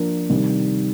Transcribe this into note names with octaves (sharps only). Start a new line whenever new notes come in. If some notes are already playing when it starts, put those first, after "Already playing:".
Already playing: F3 A#3 D4 F4 A#4
C3 D#3 G3